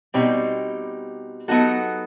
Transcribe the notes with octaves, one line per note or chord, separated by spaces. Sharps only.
B2 G3 C4 D#4
F#3 B3 D#4 F#4 A4